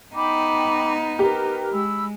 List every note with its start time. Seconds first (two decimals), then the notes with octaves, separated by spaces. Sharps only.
0.15 B3 D#4 G5 B5 D6
1.19 G4 A#4 B4
1.72 G#3 B5 E6